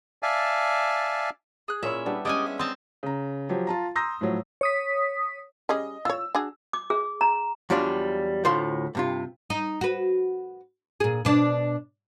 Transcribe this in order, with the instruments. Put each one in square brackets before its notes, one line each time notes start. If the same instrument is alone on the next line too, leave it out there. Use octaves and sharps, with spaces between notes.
[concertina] D5 E5 F5 G#5 A5
[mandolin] G#4 F#6
[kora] A#2 C#4 E4 [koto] E5
[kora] G3 B3 D4
[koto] G#3 C#4 G#5 [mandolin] G4 D5 D#5
[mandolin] E5
[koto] C4 A5 A#5 [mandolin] C6 D#6
[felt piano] C#3 A#5
F3 F#3 G4
F4 A5 A#5
A#5 C6 D#6 E6 G6 A#6
A2 F3 F#3
[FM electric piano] C#5 D#6 B6
[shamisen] G3 C#4 G#4 [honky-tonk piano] D#5
[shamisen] F4 C#5 [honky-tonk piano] E6
[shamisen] D4 F#4 G#4
[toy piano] D6
G#4
A#5
[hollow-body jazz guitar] E2 F#3 G3 D4 F4
D2 A2 F4 C5 F5 C6
G2 C3 F4
[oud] D#4
F#4 B4
A#2 G#4
B2 D4 D5